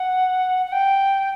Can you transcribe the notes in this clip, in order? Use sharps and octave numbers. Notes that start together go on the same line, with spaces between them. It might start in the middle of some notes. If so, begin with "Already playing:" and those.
Already playing: F#5
F#5
G5